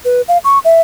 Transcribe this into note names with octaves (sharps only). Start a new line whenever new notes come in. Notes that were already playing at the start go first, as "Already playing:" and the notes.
B4
F5
C#6
E5